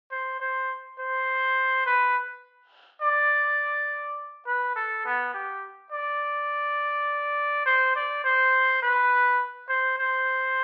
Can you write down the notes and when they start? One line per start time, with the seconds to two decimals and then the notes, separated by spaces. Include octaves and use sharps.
0.11 C5
0.40 C5
0.99 C5
1.86 B4
3.01 D5
4.47 B4
4.76 A4
5.06 B3
5.34 G4
5.92 D5
7.66 C5
7.96 D5
8.24 C5
8.83 B4
9.69 C5
9.98 C5